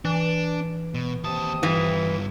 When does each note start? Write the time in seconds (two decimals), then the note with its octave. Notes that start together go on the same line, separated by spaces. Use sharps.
0.05 E3 D4
0.94 B2
1.24 D#2 C3 A5 D#6
1.63 G2 E3 F4